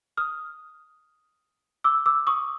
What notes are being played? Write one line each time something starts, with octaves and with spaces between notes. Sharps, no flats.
D#6 F6
D6 E6
D6 E6
C#6 D#6